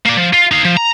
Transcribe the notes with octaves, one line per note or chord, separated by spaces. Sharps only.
A#3 D5
F3
F4
D#4 F5
F3
A#5